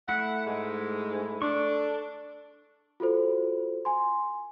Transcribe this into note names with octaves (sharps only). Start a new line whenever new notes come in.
A3 E4 F#5
G#2 G#3
D4 A4 C#6
F4 F#4 A4 C5
G#5 C6